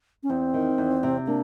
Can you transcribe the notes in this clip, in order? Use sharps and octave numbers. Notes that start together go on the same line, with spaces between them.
C#4
E2 C4
D#3
E2
C3
A#3 D4